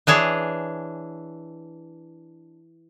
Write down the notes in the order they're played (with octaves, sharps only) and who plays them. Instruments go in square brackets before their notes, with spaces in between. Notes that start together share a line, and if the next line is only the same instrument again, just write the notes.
[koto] E3 D4 G#4 C#5